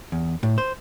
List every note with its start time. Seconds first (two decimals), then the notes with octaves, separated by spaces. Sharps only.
0.12 E2
0.43 A2
0.58 C5